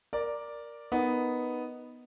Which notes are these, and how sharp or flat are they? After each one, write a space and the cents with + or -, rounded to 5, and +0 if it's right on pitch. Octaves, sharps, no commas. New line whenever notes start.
A#4 +5 D5 +0
B3 +0 D#4 +0 A#4 +0